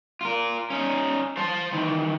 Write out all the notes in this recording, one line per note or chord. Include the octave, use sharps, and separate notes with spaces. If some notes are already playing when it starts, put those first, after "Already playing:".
F4 A#4
C#4 D#4
C5 A5
D#3 E3